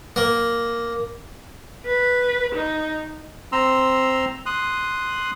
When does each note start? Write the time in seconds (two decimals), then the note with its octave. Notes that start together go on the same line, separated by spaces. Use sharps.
0.16 A#3
1.86 B4
2.54 D#4
3.52 C4 A#5 C6 E6
4.46 C6 D#6 F#6